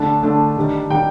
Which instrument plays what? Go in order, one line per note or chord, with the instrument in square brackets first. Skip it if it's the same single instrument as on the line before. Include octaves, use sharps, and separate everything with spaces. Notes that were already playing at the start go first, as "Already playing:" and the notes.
Already playing: [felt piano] D3 A3 D4 [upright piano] A5
[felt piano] D3 A3 D4
D#3 G3 D4
[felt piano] D#3 G3 D4 [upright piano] G5